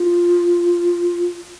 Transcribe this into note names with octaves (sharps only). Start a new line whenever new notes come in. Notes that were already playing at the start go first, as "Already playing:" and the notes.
Already playing: F4